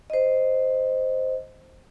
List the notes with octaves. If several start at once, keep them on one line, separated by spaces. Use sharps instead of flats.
C5 D#5